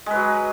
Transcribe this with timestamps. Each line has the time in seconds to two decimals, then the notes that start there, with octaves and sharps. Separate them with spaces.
0.06 G#3
0.11 B4
0.15 F#3